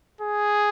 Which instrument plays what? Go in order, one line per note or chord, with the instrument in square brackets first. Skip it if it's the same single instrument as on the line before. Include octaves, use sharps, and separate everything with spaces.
[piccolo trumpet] G#4